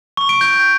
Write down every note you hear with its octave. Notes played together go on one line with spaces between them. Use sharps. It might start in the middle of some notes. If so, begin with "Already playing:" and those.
C#6
D7
G6